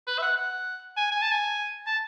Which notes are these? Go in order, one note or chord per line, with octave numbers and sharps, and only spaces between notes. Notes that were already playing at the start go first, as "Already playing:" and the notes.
B4
E5
F#5
F#5
G#5
G#5
A5
G#5
A5